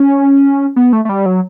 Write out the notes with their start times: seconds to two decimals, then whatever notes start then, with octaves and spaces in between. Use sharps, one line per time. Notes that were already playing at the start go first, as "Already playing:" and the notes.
Already playing: C#4
0.76 B3
0.93 A3
1.05 A3
1.09 G3
1.26 F#3